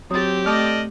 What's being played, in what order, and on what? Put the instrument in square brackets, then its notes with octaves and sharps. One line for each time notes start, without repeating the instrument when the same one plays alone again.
[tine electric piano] F#3 [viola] C4 G4 [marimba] D#6 A6
[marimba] A3 [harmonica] A4 D5 D#5 [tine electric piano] F6